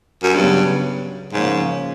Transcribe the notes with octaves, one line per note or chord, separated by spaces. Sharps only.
F#2
G2 C#3 F#3 B3
G#2 C#3 F3 A#3 C#4